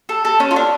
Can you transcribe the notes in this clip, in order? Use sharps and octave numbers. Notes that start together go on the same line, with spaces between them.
A4
A4
C#4
F4
D4